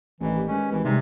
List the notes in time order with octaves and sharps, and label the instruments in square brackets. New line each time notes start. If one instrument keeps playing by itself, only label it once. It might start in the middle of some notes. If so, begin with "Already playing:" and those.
[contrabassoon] A1 [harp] G2 D#3 [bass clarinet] E3
[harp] G4
[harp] G#3 B4 [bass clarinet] C#4
[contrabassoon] G#1 [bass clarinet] E3
[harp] D2 G3 C6 [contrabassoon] G#2 [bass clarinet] C3